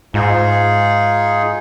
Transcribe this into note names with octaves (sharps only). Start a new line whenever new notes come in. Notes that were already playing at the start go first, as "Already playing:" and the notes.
G#2 D#4 F4 G#4